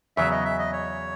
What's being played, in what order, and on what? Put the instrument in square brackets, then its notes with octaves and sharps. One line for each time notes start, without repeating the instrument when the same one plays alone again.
[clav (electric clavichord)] E2 C#3 F#3 [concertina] E5
[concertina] D#5
E5
D#5
C#5